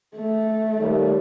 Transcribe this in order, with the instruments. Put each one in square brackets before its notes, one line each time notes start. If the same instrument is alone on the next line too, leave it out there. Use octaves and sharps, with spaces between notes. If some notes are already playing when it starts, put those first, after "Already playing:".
[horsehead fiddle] A3
[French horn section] D#2 G3